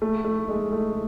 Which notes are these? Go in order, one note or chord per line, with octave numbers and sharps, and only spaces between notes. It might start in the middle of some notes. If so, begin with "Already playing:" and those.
A3
A3
G#3
A3